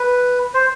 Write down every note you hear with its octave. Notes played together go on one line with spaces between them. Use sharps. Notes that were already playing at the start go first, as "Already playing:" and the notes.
Already playing: B4
C5